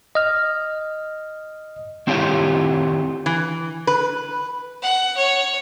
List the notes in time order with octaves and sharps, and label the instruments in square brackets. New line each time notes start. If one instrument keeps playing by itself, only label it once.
[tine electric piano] D#5 F6
[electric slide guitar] D#3 C4 E4 F4 G4 C#5
[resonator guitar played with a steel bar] E3
B4
[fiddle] F#5
C#5